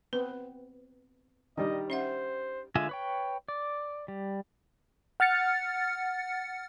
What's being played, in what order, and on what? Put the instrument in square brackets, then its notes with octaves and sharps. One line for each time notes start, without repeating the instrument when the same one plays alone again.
[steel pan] B3 C4 [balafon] B4
[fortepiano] D#3 G3 [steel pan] D4 D#4 [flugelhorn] D#5
[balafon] C#4 E5 F#5 [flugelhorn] C5
[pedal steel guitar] D3 G#3 F4 E5 G#5
B4 C#5 G5
D5
G3
[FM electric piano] F#5 F6 A6 C#7